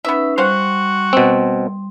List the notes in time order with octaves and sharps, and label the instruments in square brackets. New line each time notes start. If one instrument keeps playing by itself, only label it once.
[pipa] B3 E5 [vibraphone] C#4 D#4 B4
[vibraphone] G3 C6 [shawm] F#4 [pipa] C5 F5 F#5
[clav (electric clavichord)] B2 C4